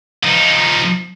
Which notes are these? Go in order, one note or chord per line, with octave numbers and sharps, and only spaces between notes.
F3 D#4